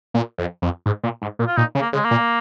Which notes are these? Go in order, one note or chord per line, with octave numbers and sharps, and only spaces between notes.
A#2
F2
F2
G#2
A#2
G#2
A#2
F4
A#2 D#4
C#3
A#3
C#3 G#3
A#3
A#2